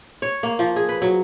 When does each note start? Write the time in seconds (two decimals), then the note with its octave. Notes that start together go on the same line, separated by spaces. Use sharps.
0.22 C#5
0.43 A#3
0.59 F3
0.76 G#4
0.89 B4
1.02 F#3